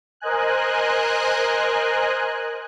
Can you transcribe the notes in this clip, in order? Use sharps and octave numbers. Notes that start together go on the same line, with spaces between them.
A#4 C5 D#5 G#5 F#6